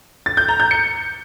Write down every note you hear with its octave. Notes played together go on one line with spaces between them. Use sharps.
A6
G6
A#5
G6
C#7